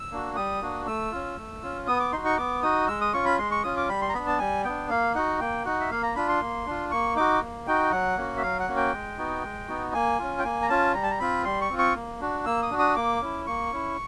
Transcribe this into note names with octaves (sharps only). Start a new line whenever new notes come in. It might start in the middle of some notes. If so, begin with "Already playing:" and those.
Already playing: E6
A#3 D4 F#4
G3 D#6
A#3 D4 F#4
A3 E6
C#4 F4
A3
C#4 F4
B3 D#6
D6
D#4 F#4 C6
C#6
B3 D6
D#4 F#4 D#6
G#3 E6
D#6
C#4 F4 C#6
B5
G#3 C6
C#6
C#4 F4 D#6
D6
G3 B5
C6
A#5
B3 D4 B5
A5
G3 G#5
B3 D4 G5
A#3 F5
D#4 F#4 F#5
A#3 G5
D#4 F#4 F#5
E5
A#3 F5
A#5
D4 F4 B5
C6
A#3
D4 F4
A#3 C#6
D#4 F#4 D6
A#3
D#4 F#4 G5
F#3 F#5
A#3 C#4 F#4
E5
F#3 F5
F#5
A#3 C#4 F#4
G5
G#3
B3 D#4 F#4
G#3
B3 D#4 F#4
A#3 G#5
C#4 F4
G5
A#3 G#5
A#5
C#4 F4 A5
G3 A#5
A5
A#5
C4 F4 B5
G3 C6
C#6
C4 F4
C#6
A#3
D4 F#4
A#3 E6
D#6
D4 F#4
D#6
A#3 D6
C#4 E4
A#3 C#6
C#4 E4